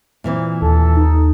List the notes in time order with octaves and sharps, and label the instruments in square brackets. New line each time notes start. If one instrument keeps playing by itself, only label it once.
[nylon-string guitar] A#2 E3 C4
[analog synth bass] D#2 [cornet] A4
[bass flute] D#4